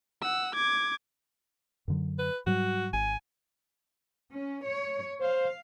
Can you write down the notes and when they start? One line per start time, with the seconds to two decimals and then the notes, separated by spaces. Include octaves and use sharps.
0.21 F#5 E6
0.55 D6 G#6
1.88 F#2 D3 F#3
2.19 B4
2.46 G#2 F#3 G3 F#4
2.93 G#1 G#5
4.31 C#4
4.67 C#5
5.20 C5 F5